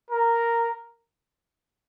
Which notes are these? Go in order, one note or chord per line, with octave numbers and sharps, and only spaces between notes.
A#4